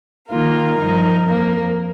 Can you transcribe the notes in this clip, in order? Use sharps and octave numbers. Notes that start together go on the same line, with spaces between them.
D#3 A#3 F4 A#4
G2 F3 D#4
F2 F3 A#3